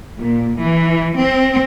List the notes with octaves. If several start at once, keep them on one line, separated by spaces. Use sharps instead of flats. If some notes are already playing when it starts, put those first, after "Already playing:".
A#2
E3
C4